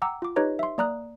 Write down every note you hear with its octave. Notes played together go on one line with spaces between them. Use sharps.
F#5 G5 A#5 D6 E6
F4 D6
D#4 G4 B4 C#5 D#5 A#5
E5 C6
A#3 D5 A#5 D#6 F#6